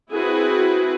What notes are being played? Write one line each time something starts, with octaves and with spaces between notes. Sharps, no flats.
C4 E4 F#4 G#4 B4